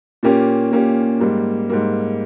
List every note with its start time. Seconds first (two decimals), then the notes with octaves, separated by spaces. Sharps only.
0.23 A#2 A#3 C#4 G4
0.71 A#2 A#3 C#4 G4
1.20 G#2 G3 A#3
1.70 G#2 G3 A#3